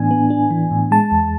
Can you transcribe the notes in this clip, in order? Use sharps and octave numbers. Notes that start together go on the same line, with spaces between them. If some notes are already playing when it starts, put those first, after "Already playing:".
Already playing: A2 E3 B3 D4 G#5
B3
D4
E3
A2
G#3 A5
E2